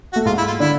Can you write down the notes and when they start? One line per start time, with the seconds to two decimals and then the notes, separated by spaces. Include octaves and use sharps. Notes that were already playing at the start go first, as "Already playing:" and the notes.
0.13 F#4
0.16 A3
0.25 G#2 G#3 F4
0.38 E4
0.48 F4
0.60 D3 D4 E4